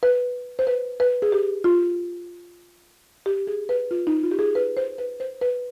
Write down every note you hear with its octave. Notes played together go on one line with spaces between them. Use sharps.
B4
C5
B4
B4
G#4
G4
F4
G4
G#4
B4
F4
D#4
F4
G4
G#4
B4
C5
B4
C5
B4